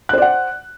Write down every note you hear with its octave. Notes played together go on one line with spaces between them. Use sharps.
C5 D5 F#5 F#6